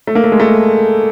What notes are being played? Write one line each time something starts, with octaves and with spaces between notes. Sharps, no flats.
A3
A#3
A3
G#3
A3